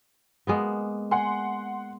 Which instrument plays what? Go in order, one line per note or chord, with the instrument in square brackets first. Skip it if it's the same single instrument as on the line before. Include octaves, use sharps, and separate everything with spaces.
[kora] G#3 A#3 B3
[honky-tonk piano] F#5 C6 [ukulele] G#5